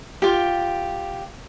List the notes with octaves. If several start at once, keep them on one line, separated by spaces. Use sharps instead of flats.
F4 G4